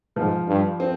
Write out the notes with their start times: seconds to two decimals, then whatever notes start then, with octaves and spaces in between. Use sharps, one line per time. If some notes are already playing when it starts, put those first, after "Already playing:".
0.16 G#2 F3
0.47 G2
0.80 C4